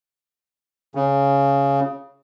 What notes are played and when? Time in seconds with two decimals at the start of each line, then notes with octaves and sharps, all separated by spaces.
0.95 C#3